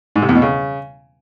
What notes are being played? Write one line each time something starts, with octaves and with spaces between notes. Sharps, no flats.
G#2
C3
E2
B2
C#3